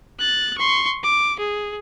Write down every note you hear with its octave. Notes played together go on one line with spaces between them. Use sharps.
F#6 A6
C6 C#6
D6
G#4